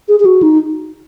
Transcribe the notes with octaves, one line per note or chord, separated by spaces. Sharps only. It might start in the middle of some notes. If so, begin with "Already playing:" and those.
G#4
G#4
F#4
D#4